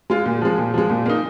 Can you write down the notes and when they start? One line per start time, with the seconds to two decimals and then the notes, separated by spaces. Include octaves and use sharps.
0.10 G#3 F4
0.26 A#2
0.42 F3 G#3
0.58 A#2
0.74 F3 G#3
0.90 A#2
1.06 A#3 D#4